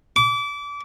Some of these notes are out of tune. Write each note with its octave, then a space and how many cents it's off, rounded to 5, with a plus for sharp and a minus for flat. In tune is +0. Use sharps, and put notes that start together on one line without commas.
D6 -25